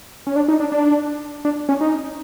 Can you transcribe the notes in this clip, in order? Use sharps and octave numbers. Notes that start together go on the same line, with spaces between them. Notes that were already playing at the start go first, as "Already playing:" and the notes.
C#4
D4
D#4
D4
D4
D4
C#4
D#4